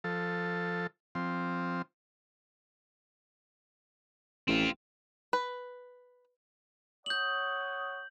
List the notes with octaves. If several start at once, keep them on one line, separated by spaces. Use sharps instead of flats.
F3 A4
F3 C4
A1 C4 F4
B4
C#5 F#5 D#6 G6 F#7